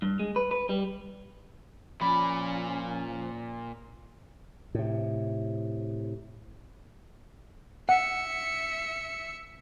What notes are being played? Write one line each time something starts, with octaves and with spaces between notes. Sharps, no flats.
G2
G#3
B4
B4
G3
A#2 F3 C#4 D5 B5
A2 C3
E5 F#5 C#7